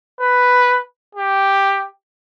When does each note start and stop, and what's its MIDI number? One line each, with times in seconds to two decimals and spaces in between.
0.20 0.81 71
1.15 1.88 67